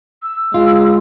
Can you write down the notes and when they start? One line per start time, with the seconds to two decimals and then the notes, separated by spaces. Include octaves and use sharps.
0.23 E6
0.54 G#3 F4